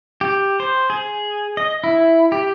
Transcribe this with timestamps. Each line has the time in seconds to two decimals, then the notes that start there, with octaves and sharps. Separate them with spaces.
0.21 G4
0.60 C5
0.90 G#4
1.57 D#5
1.84 E4
2.32 G4